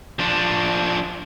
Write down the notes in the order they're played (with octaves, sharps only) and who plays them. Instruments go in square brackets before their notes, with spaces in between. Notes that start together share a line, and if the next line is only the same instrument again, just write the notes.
[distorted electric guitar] F3 D4